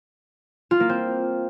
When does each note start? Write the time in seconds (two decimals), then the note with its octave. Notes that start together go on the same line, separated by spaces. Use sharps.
0.71 F4
0.80 A#3
0.89 C4